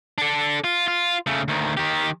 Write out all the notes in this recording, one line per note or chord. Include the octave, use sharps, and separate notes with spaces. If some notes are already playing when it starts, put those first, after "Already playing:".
D4 A4
F4
F4
C#3 A3
D2 D#3
D#3 G4